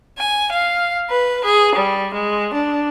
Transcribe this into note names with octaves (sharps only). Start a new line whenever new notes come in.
G#5
F5
B4
G#4
G3
G#3
D4